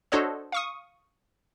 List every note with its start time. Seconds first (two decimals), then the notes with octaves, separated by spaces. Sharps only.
0.12 D4 F#4 A4 C5 C#5 D#5
0.52 F5 C#6 D#6